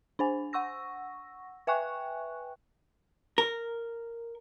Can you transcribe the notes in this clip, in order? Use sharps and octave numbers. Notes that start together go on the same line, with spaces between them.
D4 C5 G#5
F#5 C#6 E6 A#6
B4 E5 G5 G#5 C#6 F#6
A#4